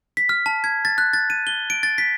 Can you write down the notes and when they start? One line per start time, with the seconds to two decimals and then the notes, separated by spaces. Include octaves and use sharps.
0.17 B6
0.29 F6
0.46 A5
0.64 G#6
0.85 A6
0.98 F#6
1.13 A6
1.30 D#7
1.47 G7
1.70 D7
1.83 A6
1.98 B6